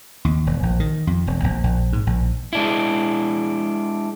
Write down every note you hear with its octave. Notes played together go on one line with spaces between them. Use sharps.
D#2
E1
A#1
D#3
F2
E1
A#1
A#1
G#2
A#1
G#3 D4 E4